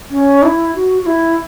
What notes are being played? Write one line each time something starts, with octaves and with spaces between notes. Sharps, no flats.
C#4
E4
F#4
F#4
E4